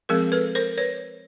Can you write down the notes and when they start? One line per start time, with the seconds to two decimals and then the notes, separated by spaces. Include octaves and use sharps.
0.09 F3 G#3 C4 G#4 A#4
0.32 A4 B4
0.55 A#4 C5
0.78 B4 C#5